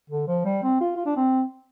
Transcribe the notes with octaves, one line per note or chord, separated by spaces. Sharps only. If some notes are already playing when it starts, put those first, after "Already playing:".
D3
F3
G3
C4
F4
F4
D4
C4